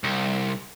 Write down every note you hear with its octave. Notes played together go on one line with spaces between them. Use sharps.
C2